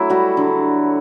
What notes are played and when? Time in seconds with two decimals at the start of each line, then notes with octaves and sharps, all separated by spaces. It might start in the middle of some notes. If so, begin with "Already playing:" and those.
Already playing: F#3 A3 E4
0.10 G3 F#4
0.37 D3